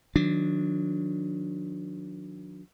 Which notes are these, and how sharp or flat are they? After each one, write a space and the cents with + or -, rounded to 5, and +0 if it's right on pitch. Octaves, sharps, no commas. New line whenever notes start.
D#3 +0 F#3 -35 D4 -10